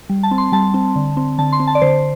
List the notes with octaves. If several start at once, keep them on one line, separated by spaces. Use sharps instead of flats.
G3
A5
C4
C6
G3 A5
C4
D3
C4
D3 A5
C6
C4
A5
D5
D3 C5